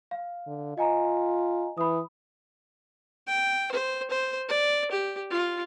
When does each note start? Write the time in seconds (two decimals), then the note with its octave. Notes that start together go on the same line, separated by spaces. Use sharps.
0.11 F5
0.47 D3
0.78 F4 D#5 G#5 A#5
1.78 E3 B5 D#6
3.27 G5
3.72 C5
4.10 C5
4.48 D5
4.91 G4
5.31 F4